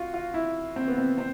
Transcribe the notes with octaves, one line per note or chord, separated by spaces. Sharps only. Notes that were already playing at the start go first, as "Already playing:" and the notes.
Already playing: F4 F#4
F4
E4
C4
B3
C4
C4